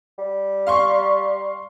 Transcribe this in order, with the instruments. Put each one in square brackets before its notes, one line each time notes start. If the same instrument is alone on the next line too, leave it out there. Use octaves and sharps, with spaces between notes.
[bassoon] G3
[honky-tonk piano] F5 C6 C#6